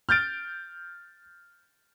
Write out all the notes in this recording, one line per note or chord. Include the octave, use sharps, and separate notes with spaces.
F6 G6 A6 D7